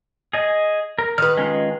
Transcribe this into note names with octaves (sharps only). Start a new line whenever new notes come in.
G#4 D#5 G#5
A#4
D#3 B4 F6
G#3 C#4 F4